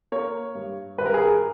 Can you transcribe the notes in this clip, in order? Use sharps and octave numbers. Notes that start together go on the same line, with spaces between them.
A#3 A#4 C#5
G2
G2 B4
A#4
G#4
A#4